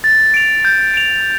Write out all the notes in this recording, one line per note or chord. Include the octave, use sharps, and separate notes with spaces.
A6
D7 F7
G6
D7 F7